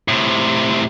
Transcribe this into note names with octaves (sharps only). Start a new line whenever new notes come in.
A2 C3